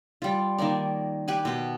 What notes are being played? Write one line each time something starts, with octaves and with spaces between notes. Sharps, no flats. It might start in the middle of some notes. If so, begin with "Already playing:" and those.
G3 F4
D#3 A#3 A#4 D5
G4 B4 G#5
B2 G4